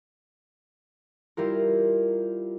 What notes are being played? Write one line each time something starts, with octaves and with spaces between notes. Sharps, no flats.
G3 E4 F4 A#4